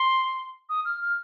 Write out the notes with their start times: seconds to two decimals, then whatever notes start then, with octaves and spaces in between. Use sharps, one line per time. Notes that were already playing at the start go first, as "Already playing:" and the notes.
Already playing: C6
0.69 D#6
0.85 F6
1.02 F6